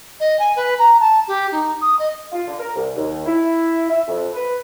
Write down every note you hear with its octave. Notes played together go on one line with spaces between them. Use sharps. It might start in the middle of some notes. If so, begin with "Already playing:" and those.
D#5
G#5
B4
A#5
A5
G4
D#4
D#6
D#5
F4
D3
A#4
C2
D#2
E4
E5
F2
B4